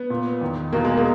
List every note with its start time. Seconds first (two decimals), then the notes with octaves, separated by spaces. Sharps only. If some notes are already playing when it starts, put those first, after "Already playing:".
Already playing: B3
0.10 A#2
0.41 E2 D#3
0.73 E2 B2 A#3
0.85 G#3
0.97 A#3